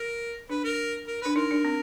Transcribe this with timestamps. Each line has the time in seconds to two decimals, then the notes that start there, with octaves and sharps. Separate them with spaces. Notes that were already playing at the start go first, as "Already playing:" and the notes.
Already playing: A#4
0.50 D4 B4
0.64 A#4
1.07 A#4
1.22 D4 B4
1.36 D#4 A#4
1.51 D4
1.65 C4